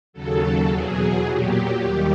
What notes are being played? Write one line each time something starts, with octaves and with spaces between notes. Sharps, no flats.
D#2 C#3 F#3 A4
E2 B2 F#3 G#4
A#2 F#3 G4
D#2 D#3 G3 G4